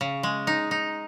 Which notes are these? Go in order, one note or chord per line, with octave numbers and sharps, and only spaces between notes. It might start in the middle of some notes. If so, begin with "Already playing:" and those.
C#3
G#3
D#4
D#4